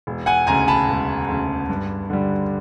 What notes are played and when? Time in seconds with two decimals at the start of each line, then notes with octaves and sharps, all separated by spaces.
0.07 E1
0.26 F#5 G#5
0.47 D2 C#3 G#5 A#5
0.68 A5 B5
0.88 E1
1.28 D2 C#3
1.69 G2
2.10 D3 G3